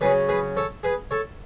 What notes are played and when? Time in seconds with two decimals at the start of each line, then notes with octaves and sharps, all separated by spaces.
0.01 C#3 F#3 C#4 G#4 B4
0.29 G#4 B4
0.57 A4 C#5
0.83 G#4 B4
1.11 A4 C#5